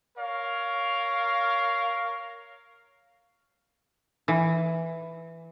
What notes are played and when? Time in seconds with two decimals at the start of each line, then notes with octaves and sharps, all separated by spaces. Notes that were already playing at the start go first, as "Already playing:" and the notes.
0.18 A#4 C#5 F5
4.28 E3